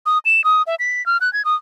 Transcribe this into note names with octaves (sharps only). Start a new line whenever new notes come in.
D#6
E7
D#6
E5
B6
F6
F#6
G#6
D#6